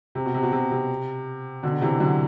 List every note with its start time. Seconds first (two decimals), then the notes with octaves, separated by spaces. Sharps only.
0.15 C3
0.25 B2
0.34 C3
0.43 B2
0.52 C3
0.71 C3
1.63 B2 D3
1.81 C3 E3
2.00 D3 F#3